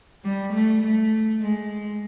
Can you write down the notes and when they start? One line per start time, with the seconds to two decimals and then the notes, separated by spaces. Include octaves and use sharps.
0.24 G3
0.53 A3
0.82 A3
1.41 G#3